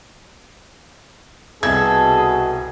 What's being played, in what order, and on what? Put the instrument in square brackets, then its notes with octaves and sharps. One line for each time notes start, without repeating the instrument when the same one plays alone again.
[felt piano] C2 G#6 [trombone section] B2 [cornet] G#4 [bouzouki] A4